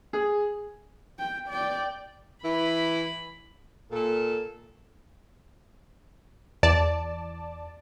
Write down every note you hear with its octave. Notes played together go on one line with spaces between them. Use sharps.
G#4
G5
D5 G5
E3 E4 B5
A#2 A4
E2 D5 A5